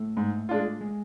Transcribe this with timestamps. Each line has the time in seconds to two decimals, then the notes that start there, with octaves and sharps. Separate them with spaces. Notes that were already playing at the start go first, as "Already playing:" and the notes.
Already playing: A2 A3
0.17 G#2
0.49 G#3 D4 F4
0.81 G#3